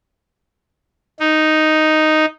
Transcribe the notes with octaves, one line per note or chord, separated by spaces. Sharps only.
D#4